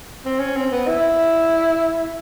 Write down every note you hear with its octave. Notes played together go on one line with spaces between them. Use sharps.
C4
C#4
C4
B3
E4